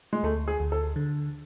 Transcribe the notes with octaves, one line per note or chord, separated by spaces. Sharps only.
G#3
D2 A3
G#4
D2
A4
D3